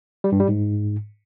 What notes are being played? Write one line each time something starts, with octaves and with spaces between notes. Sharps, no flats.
G3
G2
G3
G#2